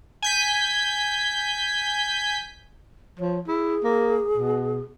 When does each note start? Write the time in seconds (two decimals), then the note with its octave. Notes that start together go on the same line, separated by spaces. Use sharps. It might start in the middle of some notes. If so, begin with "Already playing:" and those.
0.22 G#5 G6 B6
3.19 F3 C#5
3.47 E4 G#4
3.84 A#3
4.37 B2